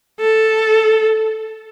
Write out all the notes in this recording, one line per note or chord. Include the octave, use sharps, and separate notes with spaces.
A4